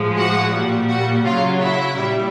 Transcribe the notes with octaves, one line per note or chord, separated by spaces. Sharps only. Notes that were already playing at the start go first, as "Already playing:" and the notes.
Already playing: A2 F3 G#3
F#4 F#5
A#2 G3
F#4 F#5
C#3 F#3 F4 F5
E4 E5
A#2 G3